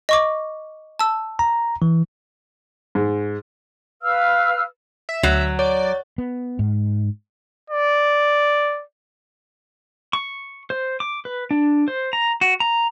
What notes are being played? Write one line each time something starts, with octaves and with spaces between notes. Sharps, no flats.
D#5 C#6 D6
A5 E6
A#5
E3
G#2
B4 F5 E6 F6
E5
D2 F#3
C#5 D5
B3
G#2
D5
C#6
C5
D6
B4
D4
C5
A#5
F#4
A#5